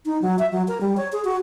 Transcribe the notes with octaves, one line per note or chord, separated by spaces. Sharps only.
D#4
F#3
E5
F#3
A#4
G3
C#5
G#4
F#4